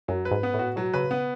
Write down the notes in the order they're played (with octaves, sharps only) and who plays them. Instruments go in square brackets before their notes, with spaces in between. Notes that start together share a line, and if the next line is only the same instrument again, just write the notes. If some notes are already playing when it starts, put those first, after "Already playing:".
[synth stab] F#2 [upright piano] F#3
[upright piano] B4
[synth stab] G#2
[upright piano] B3
[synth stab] A2
[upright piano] F#4
[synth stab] B2 [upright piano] F#3
[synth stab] C#3 [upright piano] B4
[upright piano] B3